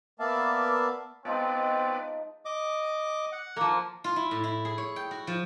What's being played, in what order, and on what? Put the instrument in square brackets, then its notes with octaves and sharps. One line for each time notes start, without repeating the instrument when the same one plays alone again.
[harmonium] A#3 B3 D5 E5 F5 A5
[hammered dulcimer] F3 G#3 D#4 [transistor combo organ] B3 D5 [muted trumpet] C4
[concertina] D#5 D6
F#5
[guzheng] F3 A#3
F4
E4
A2
E4
G#4
C#5
G5
F#4
F3